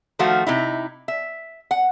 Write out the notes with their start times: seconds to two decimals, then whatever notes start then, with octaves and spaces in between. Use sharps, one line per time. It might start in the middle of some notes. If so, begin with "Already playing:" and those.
0.19 D#3 F3 A3 F4 F#4
0.47 C3 D#4 E4
1.08 E5
1.71 F#5